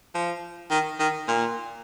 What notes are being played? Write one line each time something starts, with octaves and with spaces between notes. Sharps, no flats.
F3
D#3
D#3
A#2